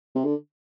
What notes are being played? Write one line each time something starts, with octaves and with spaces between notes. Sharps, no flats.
C3
D3